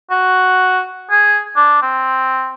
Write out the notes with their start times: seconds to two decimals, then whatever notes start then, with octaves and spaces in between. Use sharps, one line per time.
0.11 F#4
1.11 G#4
1.57 D4
1.82 C4